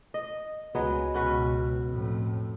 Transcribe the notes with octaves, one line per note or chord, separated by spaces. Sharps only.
D#5
C#2 F#3 G#3 B3
C#2 B2 C#4 F#4 B4
F2 A2